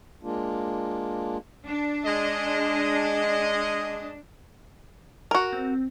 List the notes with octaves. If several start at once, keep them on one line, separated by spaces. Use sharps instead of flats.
G#3 A#3 D4 F4
D4
G#3 D#5
F#4 A#4
C4